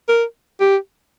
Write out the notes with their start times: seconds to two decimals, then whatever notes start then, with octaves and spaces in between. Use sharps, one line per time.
0.08 A#4
0.61 G4